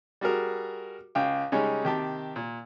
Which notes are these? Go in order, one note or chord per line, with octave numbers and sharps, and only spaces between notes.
G3 F#4 G#4 A#4
C#2 F5 G5
C#3 G3 G#3 C#4 D#4
C3 D#3 G4 A5
A#2